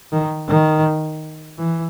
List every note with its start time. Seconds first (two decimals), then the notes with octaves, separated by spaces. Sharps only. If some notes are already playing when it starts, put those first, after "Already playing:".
0.12 D#3
0.48 D#3
1.59 E3